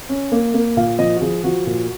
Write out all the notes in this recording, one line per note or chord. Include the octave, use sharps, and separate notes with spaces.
C#4
A#3
A#3
A#2 F5
F3 D#5
F#4
F3 G#4
F3 F#4
A#2